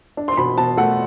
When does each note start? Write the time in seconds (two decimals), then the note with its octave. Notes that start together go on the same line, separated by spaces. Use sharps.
0.17 D4
0.28 C6
0.37 B2 B5
0.57 B2 A5
0.77 A3 F#5